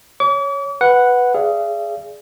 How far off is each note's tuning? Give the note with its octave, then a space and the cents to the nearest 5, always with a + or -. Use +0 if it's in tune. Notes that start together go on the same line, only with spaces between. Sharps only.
C#5 +0 D6 -45
B4 +0 F#5 +0
G#4 +5 D5 +0 F5 -40